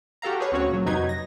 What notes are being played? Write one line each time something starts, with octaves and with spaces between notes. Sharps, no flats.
F#4 G4 A4 F5 A#5
G#4 B4 C#5
D2 C4 C#4 F#4 C#5
A#2 F#3
F2 C3 F#3 D#4 B4 G#6
A#6